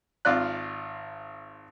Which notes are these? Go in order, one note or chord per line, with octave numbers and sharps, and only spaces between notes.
G#1 F4 D5 F#6